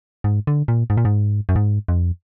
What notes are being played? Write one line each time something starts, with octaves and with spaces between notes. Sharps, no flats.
G#2
D3
A#2
G#2
A#2
G#2
F#2
G#2
F2